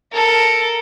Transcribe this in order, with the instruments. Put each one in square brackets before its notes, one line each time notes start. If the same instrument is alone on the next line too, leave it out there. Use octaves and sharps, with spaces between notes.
[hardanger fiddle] A4 A#4